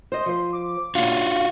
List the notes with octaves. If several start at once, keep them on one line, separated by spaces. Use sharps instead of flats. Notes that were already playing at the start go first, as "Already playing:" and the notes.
C5 D#5 C6
F3 C5
D6
A#2 C#3 D4 F4 F#4 F5